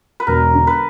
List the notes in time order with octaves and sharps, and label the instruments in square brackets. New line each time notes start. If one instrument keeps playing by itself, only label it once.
[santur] B4
[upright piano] E1 [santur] A#4
[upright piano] D3
[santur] B4